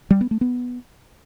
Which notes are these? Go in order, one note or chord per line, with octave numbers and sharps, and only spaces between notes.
G3
B3
A3
B3